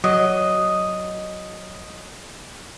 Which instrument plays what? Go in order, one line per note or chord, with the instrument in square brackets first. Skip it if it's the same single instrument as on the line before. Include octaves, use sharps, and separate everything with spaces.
[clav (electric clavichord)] F#3 [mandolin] D#5